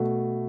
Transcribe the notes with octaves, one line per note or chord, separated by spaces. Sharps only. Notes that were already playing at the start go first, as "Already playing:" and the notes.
Already playing: B2 A3